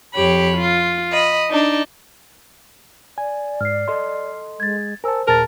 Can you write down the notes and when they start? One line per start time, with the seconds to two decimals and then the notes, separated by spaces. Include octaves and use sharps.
0.15 F2 G4 C#5 B5
0.57 F4
1.11 D#5 B5
1.50 D4 D#4
3.18 D5 G#5
3.61 G#2 F6 C7
3.88 A4 D#5 C6
4.60 G#3 G#6 A6
5.04 A#4 C5 G#5 A5 E6
5.28 D#2 A#2 G#4 A#4 A5 A6